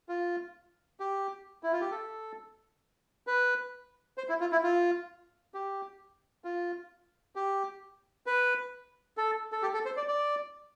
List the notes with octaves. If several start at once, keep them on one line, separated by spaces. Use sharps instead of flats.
F4
G4
E4
F4
G4
A4
B4
C5
E4
F4
E4
F4
G4
F4
G4
B4
A4
A4
G4
A4
C5
D5
D5